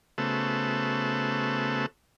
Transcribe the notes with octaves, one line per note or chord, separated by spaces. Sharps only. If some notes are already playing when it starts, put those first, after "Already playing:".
C#3 A3 B3 F#4 A4 C5